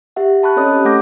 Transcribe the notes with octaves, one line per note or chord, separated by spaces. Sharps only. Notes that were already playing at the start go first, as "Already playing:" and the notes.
G4 E5 F#5
A5 B5 C#6 F#6
C4 C#4 A4 C#5 D#5 D#6
G4
A3 A4 F#5 D6 G6 A#6